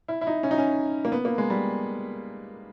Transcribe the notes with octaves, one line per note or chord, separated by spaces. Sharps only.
E4
E4
D#4
C#4
D#4
C#4
A#3
B3
A#3
G#3
G3